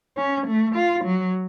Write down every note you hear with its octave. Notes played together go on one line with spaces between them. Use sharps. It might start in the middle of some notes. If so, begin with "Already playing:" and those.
C#4
A3
F4
F#3